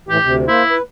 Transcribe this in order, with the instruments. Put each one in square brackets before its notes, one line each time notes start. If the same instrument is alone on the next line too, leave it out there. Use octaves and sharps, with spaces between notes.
[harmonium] A2 E3 [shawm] G4
[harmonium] D2 C3
[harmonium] A#3 C5 [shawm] E4
[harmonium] B4